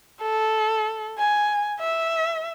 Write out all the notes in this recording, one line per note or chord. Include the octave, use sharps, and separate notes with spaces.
A4
G#5
E5